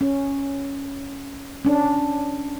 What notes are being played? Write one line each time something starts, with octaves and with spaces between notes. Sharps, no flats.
C#4
C#4 D4